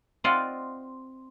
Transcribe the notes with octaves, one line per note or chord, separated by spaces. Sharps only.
C4 F4 D5 D#5 F5 F#5